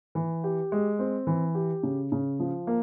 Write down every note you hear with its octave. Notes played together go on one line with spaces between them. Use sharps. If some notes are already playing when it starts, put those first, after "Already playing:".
E3
G4
G#3
C4
E3
G4
C#3
C#3
F3
A#3